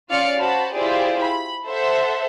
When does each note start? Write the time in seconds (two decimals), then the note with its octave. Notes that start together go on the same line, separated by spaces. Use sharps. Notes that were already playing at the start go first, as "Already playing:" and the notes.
0.10 C#4 F4 D5 F5 F6 C#7
0.40 F#4 C5 A5 B5
0.74 E4 F4 G4 G#4 C5 D5
1.22 B5
1.66 A4 C5 E5 F#5